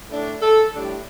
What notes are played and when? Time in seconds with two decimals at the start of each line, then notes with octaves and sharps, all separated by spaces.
0.10 A2 A3 D4
0.41 A4
0.73 A2 G3 D4